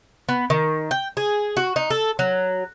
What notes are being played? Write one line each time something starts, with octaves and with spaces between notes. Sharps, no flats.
B3
D#3
G5
G#4
F#4
D#4
A4
F#3